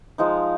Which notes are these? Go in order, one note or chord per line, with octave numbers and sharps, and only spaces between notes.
F3 G#3 D#4